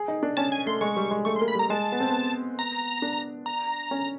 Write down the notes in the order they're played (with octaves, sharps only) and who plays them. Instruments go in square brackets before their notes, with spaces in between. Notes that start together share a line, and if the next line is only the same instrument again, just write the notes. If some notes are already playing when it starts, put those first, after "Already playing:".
Already playing: [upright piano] G#4
D#4
D4
[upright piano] C#4 [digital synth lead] A5
[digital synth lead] G#5
[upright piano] A3 [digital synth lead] C6
[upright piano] G#3 [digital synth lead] C#6
[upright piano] G3
G#3
[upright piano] A3 [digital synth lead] C#6
[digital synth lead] C6
[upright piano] A#3
[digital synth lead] B5
[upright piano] G3 [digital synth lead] A#5
[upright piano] G#3 [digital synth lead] A5
[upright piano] B3
C4
B3
[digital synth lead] A#5
[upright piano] D4
[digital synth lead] A#5
[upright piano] C#4